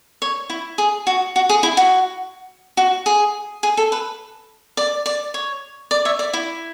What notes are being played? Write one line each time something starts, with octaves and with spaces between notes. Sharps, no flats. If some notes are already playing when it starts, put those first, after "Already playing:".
C#5
E4
G#4
F#4
F#4
G#4
E4
F#4
F#4
G#4
G#4
A4
B4
D5
D5
C#5
D5
C#5 E5
D5
E4